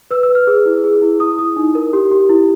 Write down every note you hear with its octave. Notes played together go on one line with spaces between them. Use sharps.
B4 E6
E6
B4
F6
G#4 E6
E4
G#4
E4
E4 D#6
E4 D#6
D#4
A#4
G4
G4
E4